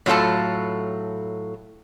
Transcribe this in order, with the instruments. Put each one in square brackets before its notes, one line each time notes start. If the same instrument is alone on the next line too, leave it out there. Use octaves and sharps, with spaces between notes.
[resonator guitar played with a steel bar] A2 F#3 F4 A4 A5